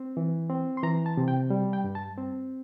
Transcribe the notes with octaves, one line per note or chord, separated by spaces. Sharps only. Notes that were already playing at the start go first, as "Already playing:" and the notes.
Already playing: C4
E3
C4
C6
E3 A#5
A5
C3
G5
G3
G5
G2
A5
C4